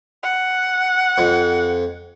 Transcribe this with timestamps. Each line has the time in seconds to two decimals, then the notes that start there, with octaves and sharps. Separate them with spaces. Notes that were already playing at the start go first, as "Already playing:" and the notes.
0.23 F#5
1.18 F2